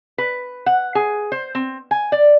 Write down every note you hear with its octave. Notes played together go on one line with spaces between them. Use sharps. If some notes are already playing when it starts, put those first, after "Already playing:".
B4
F#5
G#4
C5
C4
G#5
D5